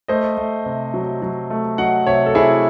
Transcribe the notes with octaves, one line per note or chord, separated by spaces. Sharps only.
A3 C5 D#5
A3
C3
F#3
F#3
A3
F#3 D#5 F#5
C3 C#5 E5
A4
C3 E4 G#4